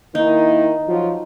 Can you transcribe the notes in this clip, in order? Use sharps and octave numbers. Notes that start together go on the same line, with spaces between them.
D#3 A#3 D#4 E4
F3 F#3 F4